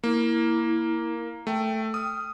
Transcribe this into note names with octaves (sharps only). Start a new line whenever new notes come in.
A#3 E4
A3 G5
D#6 F6